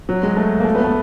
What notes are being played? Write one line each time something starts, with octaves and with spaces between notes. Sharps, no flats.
F#3
G#3
A3
A#3
A3
B3
A3